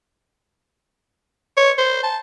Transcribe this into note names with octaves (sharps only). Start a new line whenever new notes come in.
C#5
C5
A5